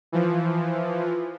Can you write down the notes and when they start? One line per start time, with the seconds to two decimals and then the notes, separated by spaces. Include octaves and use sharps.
0.12 E3 F3